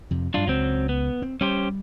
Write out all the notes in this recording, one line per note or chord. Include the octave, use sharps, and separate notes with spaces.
F2 C3
G2 F#3 D4 F4
C#2 F#3 C4
B3
C4
G3 C#4 G4 C5